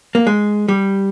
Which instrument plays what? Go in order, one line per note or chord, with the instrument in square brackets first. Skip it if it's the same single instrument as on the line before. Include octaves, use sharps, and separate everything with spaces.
[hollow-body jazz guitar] A#3
G#3
G3